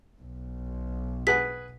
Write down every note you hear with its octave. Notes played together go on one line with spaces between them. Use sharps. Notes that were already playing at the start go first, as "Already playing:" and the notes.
B1
G#4 B4 F#5 B6